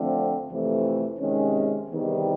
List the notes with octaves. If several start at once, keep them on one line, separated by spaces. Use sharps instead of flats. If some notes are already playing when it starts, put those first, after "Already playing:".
Already playing: F2 D3 F3 A3 C4
F2 C3 E3 A3
C3 D#3 G#3 C#4
E2 C3 D#3 G3